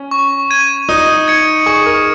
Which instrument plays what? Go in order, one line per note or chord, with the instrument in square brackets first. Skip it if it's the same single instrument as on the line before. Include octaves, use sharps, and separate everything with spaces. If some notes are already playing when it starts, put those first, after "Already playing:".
Already playing: [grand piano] C#4
[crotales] C#6
G#6 D#7
[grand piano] D#4 [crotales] D#6
[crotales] G#6 C#7
[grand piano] G#4 [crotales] C#6
[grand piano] A#4